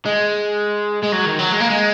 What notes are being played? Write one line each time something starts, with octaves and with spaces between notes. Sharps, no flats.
G#3
G#3
F#3
D#3
F#3
G#3
A#3
G#3